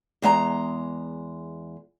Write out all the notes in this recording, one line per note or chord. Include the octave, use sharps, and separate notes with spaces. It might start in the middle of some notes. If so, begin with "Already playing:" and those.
E2 G#3 E5 A#5